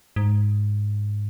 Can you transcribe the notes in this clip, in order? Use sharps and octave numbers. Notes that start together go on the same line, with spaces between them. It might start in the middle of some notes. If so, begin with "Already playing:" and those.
G#2